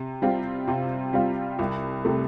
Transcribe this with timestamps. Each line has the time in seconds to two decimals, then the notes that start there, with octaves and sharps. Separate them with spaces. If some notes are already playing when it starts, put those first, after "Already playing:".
Already playing: C3
0.22 G3 C4 F4
0.68 C3
1.13 G3 C4 F4
1.59 C2
2.05 C3 A3